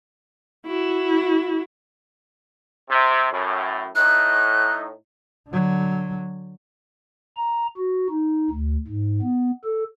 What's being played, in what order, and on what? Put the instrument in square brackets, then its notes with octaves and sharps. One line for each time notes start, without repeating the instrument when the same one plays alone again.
[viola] E4 F#4
[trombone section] C3
F#2 A2
[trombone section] A2 D#4 [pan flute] F#6
[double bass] D3 F#3
[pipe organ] A#5
F#4
D#4
D2
G#2
B3
A4